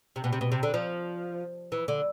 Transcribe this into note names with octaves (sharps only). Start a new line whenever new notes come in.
C3
B2
C3
B2
C3
D3
F3
E3
D3